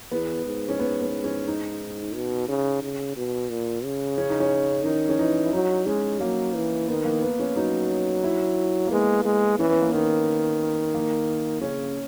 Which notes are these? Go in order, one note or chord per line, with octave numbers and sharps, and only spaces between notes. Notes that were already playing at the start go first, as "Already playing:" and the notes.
E2 B3
G#2
C#4
B3
B3
C#4
D#4
B2
C#3
C#3
B2
A#2
C#3
C#4
D#4
C#4
D#3 D#4
C#4
E3 D#4
E4
F#3 D#4
G#3 C#4
F#3 A#3
E3
D#3 B3
A#3
B3
C#4
F#3 D#4
E4
A#3
G#3 B3
G#3
E3 C#4
B3
A#3
D#3 B3
A#3
C#3 C#4